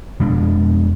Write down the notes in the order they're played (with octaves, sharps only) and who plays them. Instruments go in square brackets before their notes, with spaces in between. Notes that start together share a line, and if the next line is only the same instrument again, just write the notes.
[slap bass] F2 B2 G#3 D4